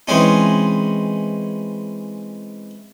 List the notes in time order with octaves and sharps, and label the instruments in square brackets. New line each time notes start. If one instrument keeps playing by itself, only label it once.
[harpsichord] E3 G#3 C4 C#4 D#4